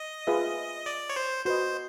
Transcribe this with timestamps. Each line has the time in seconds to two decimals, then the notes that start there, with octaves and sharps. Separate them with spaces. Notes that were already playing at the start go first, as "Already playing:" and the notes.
Already playing: D#5
0.27 F4 G#4 B4 E5
0.86 D5
1.10 C#5
1.16 C5
1.45 F#4 B4 C5 D#5